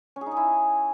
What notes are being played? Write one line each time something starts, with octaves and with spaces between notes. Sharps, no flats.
C#4
G#4
D#4
G#4
E4